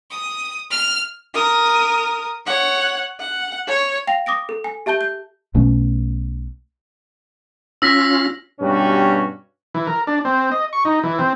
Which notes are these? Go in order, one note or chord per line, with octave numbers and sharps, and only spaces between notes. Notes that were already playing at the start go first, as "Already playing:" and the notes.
D#6
F6
A#4 D#6
C#5 F#5
F#5
C#5
F5 G5 A#6 F7
D6 D#6 A#6 D7
A4
G#5
G4 E5 A5 G6 G7
G6
B1 B2 A3 C#4
C#4 F4 E6 F6 A#6 B6
G2 B2 C#4 F#4 G4
E3
A#4
D4
C4
D#5
C#6
D#4
E3
C4